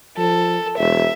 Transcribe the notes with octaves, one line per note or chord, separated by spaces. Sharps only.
F3 A4
E1 E5